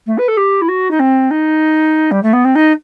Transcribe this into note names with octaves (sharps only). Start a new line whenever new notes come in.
A3
B4
A4
G4
E4
F#4
D#4
C4
D#4
G3
A3
B3
C4
D#4